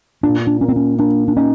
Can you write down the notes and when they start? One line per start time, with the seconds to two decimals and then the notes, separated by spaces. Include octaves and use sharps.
0.23 A#2 D4
0.47 D4
0.61 A#3 C#4
0.68 C4
0.76 C#4
0.99 A#3 D4
1.28 D4
1.37 C#4 D#4